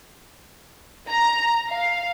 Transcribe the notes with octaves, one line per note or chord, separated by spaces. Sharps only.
A#5
F5